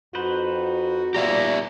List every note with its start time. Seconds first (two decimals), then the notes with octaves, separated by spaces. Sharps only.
0.15 F2 D#4 F#4 B4 C5
1.14 A#2 G4 D5 E5 A#5